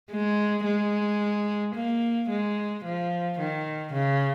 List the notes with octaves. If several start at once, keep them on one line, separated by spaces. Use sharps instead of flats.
G#3
G#3
A#3
G#3
F3
D#3
C#3